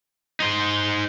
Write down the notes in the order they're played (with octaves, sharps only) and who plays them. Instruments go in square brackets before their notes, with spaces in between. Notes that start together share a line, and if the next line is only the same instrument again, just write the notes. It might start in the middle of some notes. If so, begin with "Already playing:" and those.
[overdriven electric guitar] D#4 C5